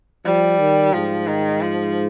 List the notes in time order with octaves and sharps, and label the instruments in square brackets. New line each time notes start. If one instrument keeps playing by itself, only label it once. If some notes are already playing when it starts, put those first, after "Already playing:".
[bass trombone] F3 [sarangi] G3
[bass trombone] D#3
[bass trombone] G#2 [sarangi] F3
[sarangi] D#3
F3